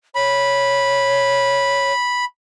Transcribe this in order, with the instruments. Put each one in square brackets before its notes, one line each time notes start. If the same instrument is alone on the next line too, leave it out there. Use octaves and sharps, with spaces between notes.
[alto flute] C#5 [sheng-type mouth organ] B5